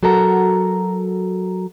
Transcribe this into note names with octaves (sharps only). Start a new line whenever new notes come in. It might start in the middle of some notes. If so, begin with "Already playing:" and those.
F#3 F#4 A4 A#4 A#5